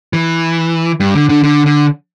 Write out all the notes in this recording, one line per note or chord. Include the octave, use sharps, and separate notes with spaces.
E3
G2
D3
D3
D3
D3